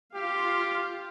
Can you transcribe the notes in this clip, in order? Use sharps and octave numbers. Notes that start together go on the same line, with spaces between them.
F4 G4 F5